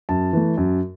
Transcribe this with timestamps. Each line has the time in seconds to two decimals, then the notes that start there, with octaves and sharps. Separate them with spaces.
0.09 F#2 A5
0.33 E3 A3
0.57 F#2